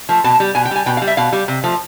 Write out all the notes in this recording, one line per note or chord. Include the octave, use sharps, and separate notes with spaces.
F3 A3
B2 A5
G3
B2 G#5
G5
G3 G#5
B2 G5
F5
G3
E5
B2 F5
G3
C3
F3 A3